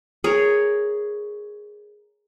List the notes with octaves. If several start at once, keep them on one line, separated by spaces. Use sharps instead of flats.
G#4 A#4 C#5